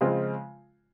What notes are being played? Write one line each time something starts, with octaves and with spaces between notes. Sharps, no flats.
C#3 F3 G#3 C4 F4